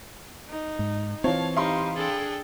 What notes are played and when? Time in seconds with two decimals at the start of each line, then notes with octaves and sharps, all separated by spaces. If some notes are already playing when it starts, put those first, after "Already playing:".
0.48 D#4
0.79 G#2
1.24 E3 C4 F4 C#5 F5 A5
1.56 D#4 G4 F5 B5 C6
1.96 D4 G#4 A4 G5